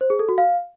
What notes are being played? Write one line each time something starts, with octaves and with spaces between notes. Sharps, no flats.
C5
G#4
A4
F#4
F5